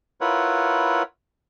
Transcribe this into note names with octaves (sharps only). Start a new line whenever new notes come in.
E4 F4 A#4 B4 C#5 F#5